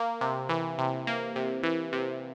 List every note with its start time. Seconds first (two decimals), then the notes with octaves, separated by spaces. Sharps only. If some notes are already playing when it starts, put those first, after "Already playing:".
Already playing: A#3
0.21 C3
0.49 E3
0.79 C3
1.07 A#3
1.36 C3
1.63 E3
1.93 C3